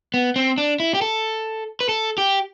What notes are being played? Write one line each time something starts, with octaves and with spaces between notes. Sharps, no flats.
B3
C4
D4
E4
G4
A4
B4
A4
G4